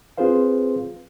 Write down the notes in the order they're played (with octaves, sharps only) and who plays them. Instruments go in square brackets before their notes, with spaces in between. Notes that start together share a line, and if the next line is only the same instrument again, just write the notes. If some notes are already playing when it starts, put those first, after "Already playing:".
[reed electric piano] C4 F4 G#4 B4 C5 F5